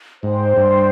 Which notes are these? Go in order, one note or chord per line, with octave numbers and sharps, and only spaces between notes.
G#2 C5 G5 C6
G2